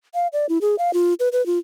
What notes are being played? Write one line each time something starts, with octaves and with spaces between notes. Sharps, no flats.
F5
D5
E4
G#4
F5
F4
B4
B4
F4